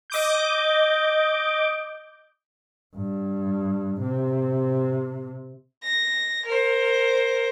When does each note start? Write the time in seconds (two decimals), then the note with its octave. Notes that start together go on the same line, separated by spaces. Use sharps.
0.10 D#5 D6 G6
2.96 G2
4.01 C3
5.82 A#6
6.45 A#4 C5